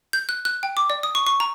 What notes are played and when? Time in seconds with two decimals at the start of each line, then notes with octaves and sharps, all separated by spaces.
0.13 G6
0.29 F#6
0.45 F#6
0.63 G5
0.77 D6
0.90 D5
1.03 D#6
1.15 C#6
1.27 C#6
1.40 A#5